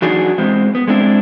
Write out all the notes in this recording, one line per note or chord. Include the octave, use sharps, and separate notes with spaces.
E3 F#3 D4 D#4 F#4 G#4
E2 E3 G#3 C4
B3
G#3 A3 C4 D4 E4